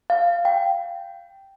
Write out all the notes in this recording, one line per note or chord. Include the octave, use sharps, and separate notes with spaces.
F5
G5